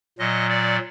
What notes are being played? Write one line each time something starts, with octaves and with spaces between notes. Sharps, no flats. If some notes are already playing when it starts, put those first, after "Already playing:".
A#2 F#3 D#5
D5